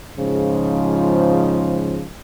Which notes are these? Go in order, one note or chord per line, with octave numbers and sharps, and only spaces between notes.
G#2 C#3 F3